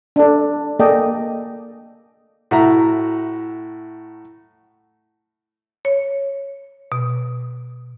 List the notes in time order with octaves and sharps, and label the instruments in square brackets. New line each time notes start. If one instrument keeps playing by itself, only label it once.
[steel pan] D4 A4
A#3 G#4 A4 D5 D#5 G5
[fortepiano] A2 F#4 E5 A#5
[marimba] C#5
B2